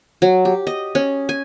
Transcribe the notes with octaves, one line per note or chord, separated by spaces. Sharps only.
F#3
G4
D#5
C#4
G#5